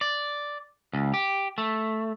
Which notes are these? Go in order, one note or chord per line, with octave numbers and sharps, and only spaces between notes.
D5
C#2
G4
A3